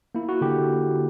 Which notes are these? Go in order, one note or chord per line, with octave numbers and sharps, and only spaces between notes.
A#3 E4
F#4
D3 G4